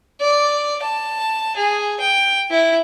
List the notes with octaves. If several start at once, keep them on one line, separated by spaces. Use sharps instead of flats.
D5
A5
G#4
G5
E4